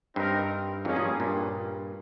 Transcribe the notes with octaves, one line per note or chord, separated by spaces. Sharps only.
G2 C4 D#4 A#4
F2 G#2 A#3 C#4 G#4
G2 A#2
G2 A#2